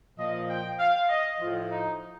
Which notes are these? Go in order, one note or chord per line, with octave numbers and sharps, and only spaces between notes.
A#2 F3 D#5
G5
F5
D#5
A2 F3 F4
D#4